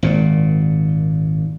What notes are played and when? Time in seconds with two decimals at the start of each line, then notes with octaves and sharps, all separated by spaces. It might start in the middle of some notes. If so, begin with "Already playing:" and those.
0.03 G#1 A#2